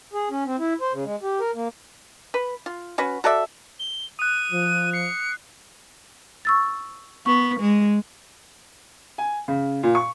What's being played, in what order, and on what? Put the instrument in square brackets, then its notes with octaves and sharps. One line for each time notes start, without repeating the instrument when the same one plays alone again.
[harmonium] G#4
C#4
C4
E4
C5
C#3
G#3
G4
A#4
A#3
[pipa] B4
F4
C#4 F#4 B4
F#4 A4 D5 E5
[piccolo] G7
[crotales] D#6 F#6 [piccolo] D#7
[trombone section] F3
[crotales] C7 [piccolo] C#7
[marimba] C#6 E6 A6
[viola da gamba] B3 [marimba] C#6
[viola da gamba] G#3
[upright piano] G#5
C#3
A#2
C#6